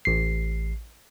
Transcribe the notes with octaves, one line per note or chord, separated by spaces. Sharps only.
A1 C7